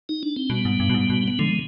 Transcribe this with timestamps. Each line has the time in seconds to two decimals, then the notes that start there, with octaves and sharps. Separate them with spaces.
0.09 D#4
0.23 D4
0.36 C4
0.50 B2 G3 B3
0.65 G#2
0.80 G2
0.90 B2
0.94 G#2
1.10 B2
1.28 B3
1.39 D3 F3 G#3